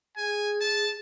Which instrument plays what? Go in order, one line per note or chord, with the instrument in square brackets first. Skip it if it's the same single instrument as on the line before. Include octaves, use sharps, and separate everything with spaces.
[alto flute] G#4 [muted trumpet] G#5
[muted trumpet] A5